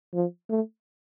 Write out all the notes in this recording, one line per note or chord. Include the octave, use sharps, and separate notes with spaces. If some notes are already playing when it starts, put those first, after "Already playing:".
F3
A3